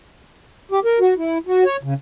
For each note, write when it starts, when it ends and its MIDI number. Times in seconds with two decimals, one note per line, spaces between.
0.72 0.80 67
0.85 0.99 70
1.00 1.14 66
1.18 1.38 64
1.47 1.64 66
1.65 1.77 73
1.83 1.94 49